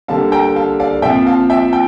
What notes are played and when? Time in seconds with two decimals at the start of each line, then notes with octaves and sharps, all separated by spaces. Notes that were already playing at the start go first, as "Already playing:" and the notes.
0.08 D3 G3 A#3 F5 A5
0.32 G5 A#5
0.56 F5 A5
0.80 D5 F5
1.02 A#2 F3 C4 E5 G5
1.26 F5 A5
1.50 E5 G5
1.73 G5